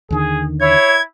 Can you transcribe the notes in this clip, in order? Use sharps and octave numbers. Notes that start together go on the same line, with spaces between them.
D#2 D3 D#3 G#4
E4 C#5 G#6